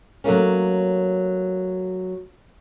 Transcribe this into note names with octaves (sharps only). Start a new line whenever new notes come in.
F#3 A3 A#3 C#4